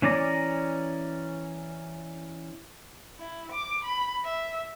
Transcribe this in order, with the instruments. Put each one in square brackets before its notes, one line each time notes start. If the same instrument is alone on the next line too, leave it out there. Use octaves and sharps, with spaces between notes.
[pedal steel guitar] E3 C#4 D5 A#5
[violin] E4
D6
B5
E5